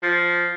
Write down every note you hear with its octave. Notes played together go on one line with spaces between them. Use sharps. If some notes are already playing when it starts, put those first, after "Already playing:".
F3